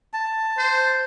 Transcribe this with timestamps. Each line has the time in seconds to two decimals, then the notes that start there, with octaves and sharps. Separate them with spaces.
0.13 A5
0.58 C5